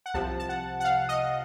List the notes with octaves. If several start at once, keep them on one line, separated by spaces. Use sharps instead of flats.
F#5
C2 C3 F3 A5
A5
F#5
F#5
F5
D#5